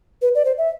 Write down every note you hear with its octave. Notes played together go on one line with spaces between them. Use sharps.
B4
D5
C5
E5